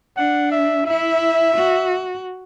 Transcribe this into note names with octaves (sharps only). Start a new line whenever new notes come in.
D4 F#5
E5
E4 E5
F#4